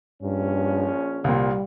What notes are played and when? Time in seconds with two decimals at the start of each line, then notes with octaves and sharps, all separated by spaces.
0.23 A#1 G2 C#4
1.24 C2 A#2 G3